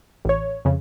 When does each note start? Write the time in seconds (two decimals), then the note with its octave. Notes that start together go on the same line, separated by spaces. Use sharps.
0.25 A1 C#5
0.65 F2 C#3